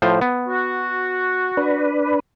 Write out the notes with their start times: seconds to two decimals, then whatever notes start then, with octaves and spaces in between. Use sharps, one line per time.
0.02 A2 F3 C5
0.21 B3
0.48 F#4
1.57 D4 B4